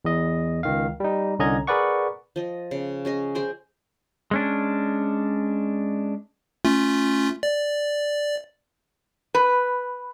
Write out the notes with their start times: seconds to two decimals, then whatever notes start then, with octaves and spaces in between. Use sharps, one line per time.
0.05 E2 D#5
0.63 C#2 D#3 F5
1.00 G3 D#4
1.39 C2 D3 C#4 D#5 A#5 G#6
1.67 G#4 A#4 B4 D5 F#5 C#6
2.36 F3 D#5
2.71 C#3
3.05 C#4 G#4 D#5
3.35 G#4 C5 G5
4.31 G#3 C#4 D4
6.65 A3 C#4 F4
7.43 D5
9.35 B4